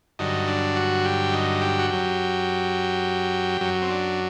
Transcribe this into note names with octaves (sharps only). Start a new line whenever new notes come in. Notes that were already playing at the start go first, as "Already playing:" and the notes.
G2 D3 F#3 D#4
D4
F#4
G4
D#4
G4
F#4
F#2 F#3 G4
F#2 F#3
C4
D4